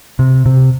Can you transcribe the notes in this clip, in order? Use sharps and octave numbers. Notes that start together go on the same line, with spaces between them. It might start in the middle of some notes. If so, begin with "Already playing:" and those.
C3
C3